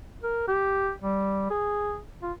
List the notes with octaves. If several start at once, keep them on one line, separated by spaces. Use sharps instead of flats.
A#4
G4
G3
G#4
F4